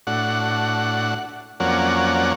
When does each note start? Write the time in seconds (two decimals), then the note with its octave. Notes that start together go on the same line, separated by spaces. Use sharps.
0.07 A2 D4 F#4 F#5
1.60 F2 F#3 A#3 C#4 D5 F#5